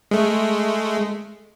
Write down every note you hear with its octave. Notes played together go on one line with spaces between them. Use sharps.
G#3 A3